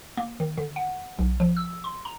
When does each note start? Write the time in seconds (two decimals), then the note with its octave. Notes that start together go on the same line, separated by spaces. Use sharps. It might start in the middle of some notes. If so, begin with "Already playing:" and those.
0.17 A#3
0.40 D#3
0.57 D3
0.76 F#5
1.19 B1
1.40 F3
1.57 E6
1.84 C6
2.05 A#5